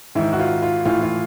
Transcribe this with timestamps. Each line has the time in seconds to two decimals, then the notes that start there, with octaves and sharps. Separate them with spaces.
0.15 G#2 D#3 E4
0.33 F#4
0.39 F4
0.62 F4
0.85 A2 E3 F4
1.02 F4